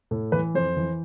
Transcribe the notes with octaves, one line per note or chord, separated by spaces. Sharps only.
A2
E3 B4
F2 C5
E3